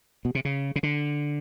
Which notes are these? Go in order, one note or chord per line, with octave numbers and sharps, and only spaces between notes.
B2
C3
C#3
C#3
D3